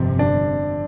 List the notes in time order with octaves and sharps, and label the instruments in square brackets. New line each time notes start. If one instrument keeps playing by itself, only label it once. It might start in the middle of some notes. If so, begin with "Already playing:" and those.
Already playing: [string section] G1 F2 C3 [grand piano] C4
[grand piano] D4